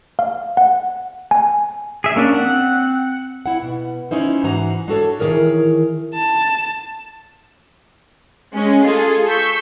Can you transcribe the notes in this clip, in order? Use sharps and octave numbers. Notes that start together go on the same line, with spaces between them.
F5
F#5
G#5
G#4 E5
A#3 C#4 D4
C4 F#5
E4 F#5
B2
C#4 D#4 E4 C5
G#2 E3 F#4 C5 A#5
G#3 D4 F#4 A4 C#5
D#3 E3 C#4 G#4 A#4 C#5
A5
G#3 C#4
F4 G#4 A4
C#6 E6 G6 B6